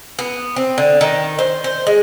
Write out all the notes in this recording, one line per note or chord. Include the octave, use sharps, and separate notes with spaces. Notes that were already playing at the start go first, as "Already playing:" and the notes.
B3
C4
D3
D#3
C5
C5
G#3